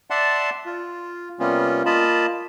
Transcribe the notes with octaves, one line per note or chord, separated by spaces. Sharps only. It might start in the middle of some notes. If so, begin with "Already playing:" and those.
D5 E5 F#5 A5 C6
F4
C3 G3 A#3 B3 C#4 F4
A#3 F4 D#5 A5 B5